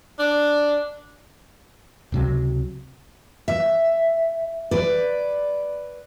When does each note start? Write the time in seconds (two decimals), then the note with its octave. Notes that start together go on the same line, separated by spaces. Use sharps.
0.19 D4
2.12 C#2 C3 F#3
3.48 E5
4.71 B4 D5